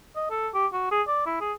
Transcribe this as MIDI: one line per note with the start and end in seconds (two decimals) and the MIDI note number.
0.16 0.27 75
0.30 0.48 69
0.54 0.66 67
0.73 0.88 66
0.91 1.02 68
1.07 1.24 74
1.26 1.37 64
1.40 1.53 68